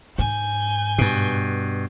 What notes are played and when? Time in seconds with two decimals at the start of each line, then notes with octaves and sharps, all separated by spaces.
0.18 G#2 G#5 G6
0.98 G2 B2